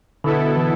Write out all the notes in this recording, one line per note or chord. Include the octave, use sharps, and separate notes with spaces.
B2 D3 B3 E4 A4
E3